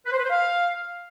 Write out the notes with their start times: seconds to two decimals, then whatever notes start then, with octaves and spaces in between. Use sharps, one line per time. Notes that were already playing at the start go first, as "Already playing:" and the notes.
0.06 B4
0.12 C5
0.18 B4
0.24 C5
0.30 F5